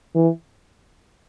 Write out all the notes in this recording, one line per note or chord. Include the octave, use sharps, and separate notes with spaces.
E3